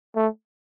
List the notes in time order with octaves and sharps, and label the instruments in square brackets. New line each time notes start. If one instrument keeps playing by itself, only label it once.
[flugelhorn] A3